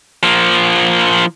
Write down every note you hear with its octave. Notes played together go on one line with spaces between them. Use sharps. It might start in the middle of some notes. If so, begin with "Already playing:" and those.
F3 A#3